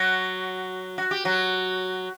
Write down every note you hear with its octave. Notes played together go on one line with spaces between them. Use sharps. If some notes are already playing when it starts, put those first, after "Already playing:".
Already playing: F#3 F#4
F#4
G4
F#3 F#4